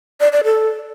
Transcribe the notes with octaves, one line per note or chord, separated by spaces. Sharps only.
D5
D5
A4